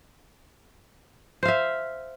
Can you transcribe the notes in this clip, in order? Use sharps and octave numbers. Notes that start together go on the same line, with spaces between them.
C5 E5 F5